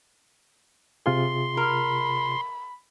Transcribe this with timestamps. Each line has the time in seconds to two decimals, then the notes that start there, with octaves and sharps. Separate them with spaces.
1.06 C3 F4 G#4 C6
1.57 A#4 B5